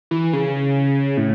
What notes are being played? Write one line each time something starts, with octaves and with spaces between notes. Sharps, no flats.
E3
C#3
A2